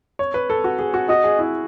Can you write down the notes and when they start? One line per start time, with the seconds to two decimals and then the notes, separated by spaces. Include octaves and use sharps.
0.19 C#5
0.34 B4
0.50 A4
0.64 F#4
0.79 G#4
0.94 F#4
1.09 F#4 D#5
1.24 G#4
1.39 E4